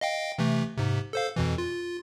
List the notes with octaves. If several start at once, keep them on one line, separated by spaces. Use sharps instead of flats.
D#5 F5 G5
C3 E3 A3
G#2 C3
A4 C5 F5
F2 B2 E3
F4